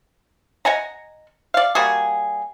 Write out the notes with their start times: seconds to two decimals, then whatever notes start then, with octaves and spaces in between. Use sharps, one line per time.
0.65 D#5 F#5 G#5 A#5
1.54 D5 F5
1.75 G3 A#3 F#4 G#4